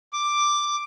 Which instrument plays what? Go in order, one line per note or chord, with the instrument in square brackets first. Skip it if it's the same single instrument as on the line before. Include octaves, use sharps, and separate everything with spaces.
[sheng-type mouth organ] D6